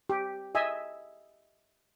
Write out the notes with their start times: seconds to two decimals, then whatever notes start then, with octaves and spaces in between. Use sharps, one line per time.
0.10 G4
0.55 D#5 E5 G#5